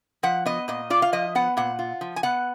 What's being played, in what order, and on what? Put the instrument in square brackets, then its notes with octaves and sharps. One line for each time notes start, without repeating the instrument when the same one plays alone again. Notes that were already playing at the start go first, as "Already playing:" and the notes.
[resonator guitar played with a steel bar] F3 F#5
B3 D#5
A#2 D#5
F4 D5
F5
F3 D#5
B3 F#5
A#2 F#5
F4
F3
G#5
B3 F#5